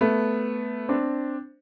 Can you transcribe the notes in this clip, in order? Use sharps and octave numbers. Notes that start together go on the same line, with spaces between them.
A3 B3
C4 D4